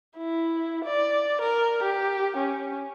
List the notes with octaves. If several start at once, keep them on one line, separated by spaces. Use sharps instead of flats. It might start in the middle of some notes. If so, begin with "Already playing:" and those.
E4
D5
A#4
G4
C#4